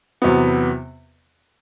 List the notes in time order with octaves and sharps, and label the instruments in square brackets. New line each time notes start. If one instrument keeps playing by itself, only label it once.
[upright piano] E2 C3 F#3 B3